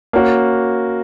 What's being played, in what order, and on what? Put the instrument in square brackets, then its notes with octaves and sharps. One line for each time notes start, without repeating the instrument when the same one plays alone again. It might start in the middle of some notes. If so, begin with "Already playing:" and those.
[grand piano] A#3 C#4 F#4